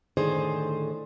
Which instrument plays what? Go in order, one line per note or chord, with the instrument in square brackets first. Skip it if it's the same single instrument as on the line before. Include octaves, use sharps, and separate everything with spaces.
[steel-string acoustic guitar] A2 D3 D#3 G#4 C5 D5